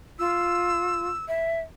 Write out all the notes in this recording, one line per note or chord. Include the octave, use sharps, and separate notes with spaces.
F4 E6
E5